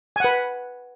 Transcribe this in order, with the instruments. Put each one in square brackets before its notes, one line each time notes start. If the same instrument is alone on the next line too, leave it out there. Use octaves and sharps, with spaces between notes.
[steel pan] G#5
F#5
B4